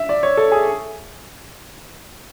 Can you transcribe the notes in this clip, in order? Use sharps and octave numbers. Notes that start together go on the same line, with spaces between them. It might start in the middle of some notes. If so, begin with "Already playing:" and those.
Already playing: E5
D5
C#5
A4
G#4